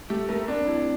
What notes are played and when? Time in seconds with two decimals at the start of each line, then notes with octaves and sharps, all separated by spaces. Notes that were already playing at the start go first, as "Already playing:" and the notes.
0.10 A3 G4
0.29 A3 A#4
0.48 C4 D4
0.67 E4